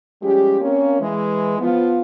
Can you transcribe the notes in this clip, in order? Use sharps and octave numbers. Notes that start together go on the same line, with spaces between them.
F3 G3 G#3 C#4 G4
A#3 C4 C#4
E3 G#3
F3 B3 F4